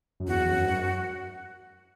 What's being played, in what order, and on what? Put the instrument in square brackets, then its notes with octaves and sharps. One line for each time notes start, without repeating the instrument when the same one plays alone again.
[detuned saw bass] F#2
[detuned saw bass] E2 [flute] F#4
[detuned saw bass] E2
F#2
G#2
F#2